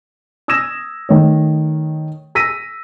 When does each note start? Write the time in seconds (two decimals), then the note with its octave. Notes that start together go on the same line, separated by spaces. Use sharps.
0.48 D#6 E6 G#6 A#6 E7
1.09 D#3 A3 C#5
2.35 E6 A#6 B6 D#7